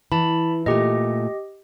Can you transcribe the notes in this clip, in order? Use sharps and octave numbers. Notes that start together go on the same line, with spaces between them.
E3 A5 B5
A#2 A3 G4 D#5